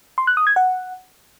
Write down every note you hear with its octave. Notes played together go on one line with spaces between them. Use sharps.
C6
F#6
D#6
G#6
F#5